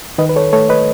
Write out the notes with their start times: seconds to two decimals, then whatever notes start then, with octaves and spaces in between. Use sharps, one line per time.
0.18 D#3 B4 D#5
0.29 B4
0.36 A4 C#5
0.53 A3 A4 C#5
0.69 B4 D#5